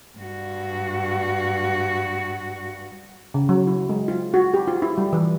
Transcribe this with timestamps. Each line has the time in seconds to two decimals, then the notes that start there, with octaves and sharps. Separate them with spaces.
0.18 G2 F#4
3.34 C#3
3.49 F#3
3.67 E4
3.89 G#3
4.08 F4
4.34 F#4
4.54 G4
4.68 F4
4.82 E4
4.98 G3
5.13 E3